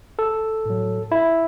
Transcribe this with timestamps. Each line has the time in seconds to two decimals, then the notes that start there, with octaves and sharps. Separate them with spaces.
0.19 A4
0.66 A2 F#3
1.12 E4